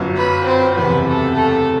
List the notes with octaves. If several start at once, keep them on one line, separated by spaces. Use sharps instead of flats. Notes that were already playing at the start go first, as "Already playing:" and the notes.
Already playing: G1 F#2 F#3
B4 B5
C4 C5
F#1 E2 C3 B3 B4
A3 A4
A3 A4